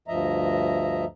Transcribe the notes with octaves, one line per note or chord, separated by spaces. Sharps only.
D2 G2 F3 D#5 E5 A#5